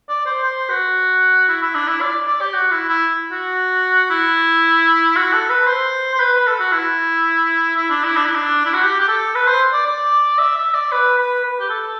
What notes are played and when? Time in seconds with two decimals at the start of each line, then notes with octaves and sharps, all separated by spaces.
0.09 D5
0.26 C5
0.44 C5
0.69 F#4
1.49 E4
1.62 E4
1.75 D4
1.88 E4
2.01 D5
2.27 D5
2.41 G4
2.53 F#4
2.71 E4
2.88 E4
3.32 F#4
4.10 E4
5.16 F#4
5.33 A4
5.50 B4
5.67 C5
6.14 C5
6.20 B4
6.33 B4
6.47 A4
6.60 F#4
6.72 E4
7.77 E4
7.90 D4
8.04 E4
8.16 D4
8.26 E4
8.35 D4
8.65 E4
8.74 F#4
8.82 G4
9.00 G4
9.08 A4
9.35 B4
9.48 C5
9.73 D5
9.86 D5
10.38 E5
10.57 E5
10.74 D5
10.92 B4
11.18 B4
11.44 B4
11.60 G4
11.70 A4